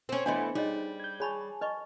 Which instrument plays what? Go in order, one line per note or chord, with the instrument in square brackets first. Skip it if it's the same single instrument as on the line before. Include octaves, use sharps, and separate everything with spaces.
[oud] C4 C#4
[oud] E3 A3 B3 [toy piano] D4 D#5 C6
[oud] G3 [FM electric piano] D#4 [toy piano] G#4 C#5 D#5
[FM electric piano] G6 G#6
[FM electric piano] G#4 G#5 A5 [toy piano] C#5 B5 C#6
[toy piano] B4 D#5 C#6